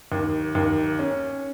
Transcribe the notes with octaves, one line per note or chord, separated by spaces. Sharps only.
D#2
D#2
C#4